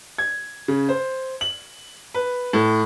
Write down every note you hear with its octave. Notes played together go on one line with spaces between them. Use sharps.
G#6
C#3
C5
F#7
B4
A2